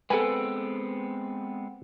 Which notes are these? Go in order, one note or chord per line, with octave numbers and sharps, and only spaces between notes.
G#3 B3 C4 A4 B4 G#5